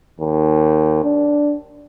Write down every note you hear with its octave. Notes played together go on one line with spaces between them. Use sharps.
D#2
D4